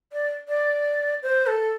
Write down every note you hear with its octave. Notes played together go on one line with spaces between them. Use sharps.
D5
D5
C5
A4